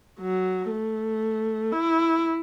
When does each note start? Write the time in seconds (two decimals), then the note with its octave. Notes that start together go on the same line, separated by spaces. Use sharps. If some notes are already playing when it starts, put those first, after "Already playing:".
0.20 F#3
0.70 A3
1.72 E4